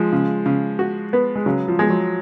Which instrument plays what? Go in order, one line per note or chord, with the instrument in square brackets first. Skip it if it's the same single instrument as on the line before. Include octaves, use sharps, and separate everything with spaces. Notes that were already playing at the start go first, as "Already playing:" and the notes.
Already playing: [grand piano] F3 G#3
[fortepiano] C#3
C#3
F#4
B3
[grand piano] G#3
[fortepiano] C#3 [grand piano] F#3
[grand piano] F3
[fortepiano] G#3
[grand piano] F#3